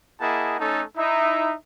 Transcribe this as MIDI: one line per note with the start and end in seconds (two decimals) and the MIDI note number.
0.20 0.56 58
0.20 0.56 64
0.20 0.56 68
0.20 0.56 75
0.20 0.56 78
0.20 0.56 81
0.60 0.83 57
0.60 0.83 61
0.60 0.83 63
0.60 0.83 69
0.60 0.83 73
0.60 0.83 81
0.98 1.54 63
0.98 1.54 64
0.98 1.54 76